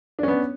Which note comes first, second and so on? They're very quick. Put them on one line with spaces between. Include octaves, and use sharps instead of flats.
D4 C#4 B3